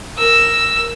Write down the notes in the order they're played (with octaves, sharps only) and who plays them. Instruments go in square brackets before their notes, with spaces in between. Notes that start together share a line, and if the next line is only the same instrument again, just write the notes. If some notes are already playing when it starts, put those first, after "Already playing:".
[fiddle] A#4 E6